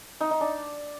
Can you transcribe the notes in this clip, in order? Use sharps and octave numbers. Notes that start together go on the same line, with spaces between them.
D#4
D#4
D4